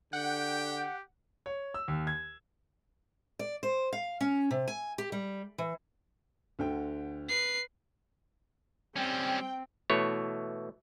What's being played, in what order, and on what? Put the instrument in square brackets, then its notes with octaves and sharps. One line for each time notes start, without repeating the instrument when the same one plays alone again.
[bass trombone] D3 [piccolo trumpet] G4 [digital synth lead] F#5 [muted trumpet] G5
[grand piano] C#5
E6
D#2
G#6
[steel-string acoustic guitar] D5
C5
F5
C#4
C3
G#5
G4
G3
E3
[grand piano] D2 D3 G5
[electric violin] B4 C7
[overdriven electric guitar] G3 C#4 [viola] C4 [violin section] G5
[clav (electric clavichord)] B2 E3 A3 C#5